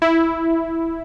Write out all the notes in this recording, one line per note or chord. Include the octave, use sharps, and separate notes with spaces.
E4